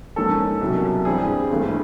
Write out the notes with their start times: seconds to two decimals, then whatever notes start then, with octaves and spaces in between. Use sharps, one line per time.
0.16 G#2 F3 A#3 C#4 A4
0.61 C2 B2 F#3 A#3 C#4
1.05 G2 E3 G3 C4 G#4
1.50 G#1 G2 E3 A3